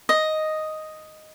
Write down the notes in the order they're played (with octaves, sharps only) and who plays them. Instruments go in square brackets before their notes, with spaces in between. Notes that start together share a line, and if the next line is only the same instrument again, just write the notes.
[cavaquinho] D#5